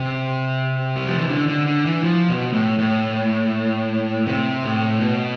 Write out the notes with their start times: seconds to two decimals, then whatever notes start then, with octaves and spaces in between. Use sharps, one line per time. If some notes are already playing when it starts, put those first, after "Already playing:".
Already playing: C3
0.96 G3
1.07 F3
1.18 E3
1.29 D3
1.48 D3
1.66 D3
1.85 E3
2.04 F3
2.29 B2
2.53 A2
2.78 A2
4.26 C3
4.64 A2
5.00 B2